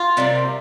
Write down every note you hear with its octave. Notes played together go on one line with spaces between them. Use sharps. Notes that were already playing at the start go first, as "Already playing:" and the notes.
Already playing: F4
C3 G3 A#3